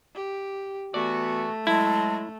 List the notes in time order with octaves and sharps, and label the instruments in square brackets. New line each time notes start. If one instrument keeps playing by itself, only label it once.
[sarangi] G4
[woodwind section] E3 B3 F#4 [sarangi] A3 [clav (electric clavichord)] D5
[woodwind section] F#3 G#3 [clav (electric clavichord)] E4 [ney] A5